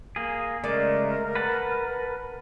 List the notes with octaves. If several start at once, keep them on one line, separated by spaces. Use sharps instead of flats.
A#3 G#4
C#3 G#3 A3 A#4 D5
B4 F#5 A5